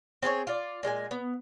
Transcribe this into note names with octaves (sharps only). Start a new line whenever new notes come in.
C4 G#4 C5 C#5
F4 D5
A#2 G#3 A4 G#5
B3